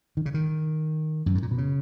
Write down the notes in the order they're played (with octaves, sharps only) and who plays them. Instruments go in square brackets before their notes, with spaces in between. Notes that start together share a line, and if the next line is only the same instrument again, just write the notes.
[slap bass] D#3
C#3
D#3
F#2
G#2
A#2
B2
C#3